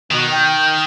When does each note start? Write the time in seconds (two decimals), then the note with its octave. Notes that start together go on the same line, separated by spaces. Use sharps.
0.11 B2 D#3 B3
0.32 G5